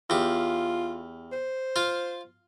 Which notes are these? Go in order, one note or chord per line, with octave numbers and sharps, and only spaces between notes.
E2 F4 G4
C5
F4 F5